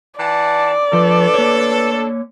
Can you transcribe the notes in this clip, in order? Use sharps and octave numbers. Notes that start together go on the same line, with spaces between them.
E3 D5 F#5 A5
F3 A3 D4 A4 B4
A#3 C#5